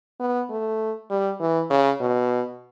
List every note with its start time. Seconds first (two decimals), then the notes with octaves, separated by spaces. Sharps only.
0.20 B3
0.50 A3
1.11 G3
1.40 E3
1.70 C#3
2.00 B2